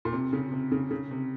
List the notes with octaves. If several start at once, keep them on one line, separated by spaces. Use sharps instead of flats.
A#2
C3
C#3
C3
C#3
C#3
C3